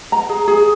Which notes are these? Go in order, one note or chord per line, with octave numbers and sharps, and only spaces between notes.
A#5
G#4
G#4